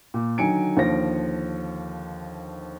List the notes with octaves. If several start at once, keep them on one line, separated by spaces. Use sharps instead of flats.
A#2
D3 D#3 F#3 G#5 C#7 D7
D#2 D3 F3 A#6